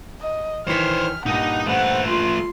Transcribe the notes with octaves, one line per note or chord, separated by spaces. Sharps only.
D#5
D#3 E3 C5 C#5 F6 B6
G2 A#2 D#4 D#5 F#5
A3 B4 C5 F#5
F4 C6